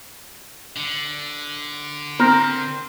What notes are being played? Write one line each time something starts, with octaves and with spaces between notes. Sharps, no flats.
D3
C4 A#4